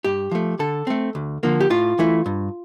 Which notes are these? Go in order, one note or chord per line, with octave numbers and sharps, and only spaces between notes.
G2 G4
F3 A3
D3 A4
A3 C4
D2
D3 F3 A#3
G4
A2 F4
E3 A3 E4
G2